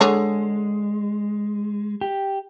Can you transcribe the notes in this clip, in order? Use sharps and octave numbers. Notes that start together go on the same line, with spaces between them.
D3 G#3 G#4 C#5
G4